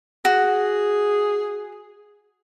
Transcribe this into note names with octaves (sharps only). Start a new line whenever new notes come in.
F#4 G#4